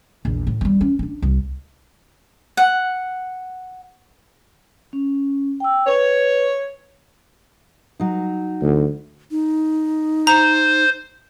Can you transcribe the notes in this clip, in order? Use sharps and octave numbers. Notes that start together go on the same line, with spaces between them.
A#1 E2
A2
G3 B3
C#4
C#4 D4
C2
F#5
C#4
G5 E6
B4 C#5
F#3 D#4
D2
D#4
C5 A#5